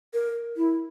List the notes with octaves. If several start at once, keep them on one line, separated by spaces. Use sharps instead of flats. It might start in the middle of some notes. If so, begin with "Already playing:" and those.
A#4
E4